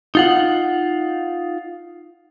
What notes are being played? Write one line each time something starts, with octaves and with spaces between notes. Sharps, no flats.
D#4 F4 F#5